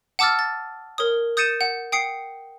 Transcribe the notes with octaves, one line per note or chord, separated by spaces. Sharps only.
F#5 A5 D6 E6 F6 A6
A6
A#4 C#5 D#6
D#6 G6 A6 C#7 D#7 E7
F#5
G5 D#6 C7 C#7